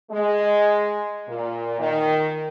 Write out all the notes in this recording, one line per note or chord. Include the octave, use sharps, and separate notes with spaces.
G#3
A#2
D#3